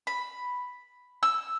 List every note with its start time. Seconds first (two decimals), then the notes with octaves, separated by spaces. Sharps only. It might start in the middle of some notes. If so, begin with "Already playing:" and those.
0.07 B5
1.23 E6